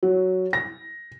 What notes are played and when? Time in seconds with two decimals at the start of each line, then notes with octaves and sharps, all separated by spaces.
0.03 F#3
0.53 A#6